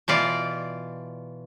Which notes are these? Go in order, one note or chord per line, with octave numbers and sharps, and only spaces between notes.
B2 E3 F4 D5